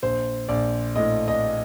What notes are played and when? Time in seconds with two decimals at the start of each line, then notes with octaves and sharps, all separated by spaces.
0.02 A#1 C5
0.49 A#1 D5
0.96 A2 D#5
1.28 D#5